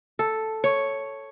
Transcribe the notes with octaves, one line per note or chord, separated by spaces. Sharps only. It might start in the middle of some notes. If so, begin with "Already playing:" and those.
A4
C#5